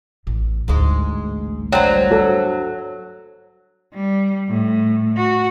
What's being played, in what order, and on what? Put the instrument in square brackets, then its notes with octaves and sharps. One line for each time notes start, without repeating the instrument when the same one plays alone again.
[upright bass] A1 E2
[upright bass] A1 D2 [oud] G#2 G#3
[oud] G2 C5 [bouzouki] F#3 [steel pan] G5
[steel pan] F#4 A4 F#5
[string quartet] G3
A2
F#4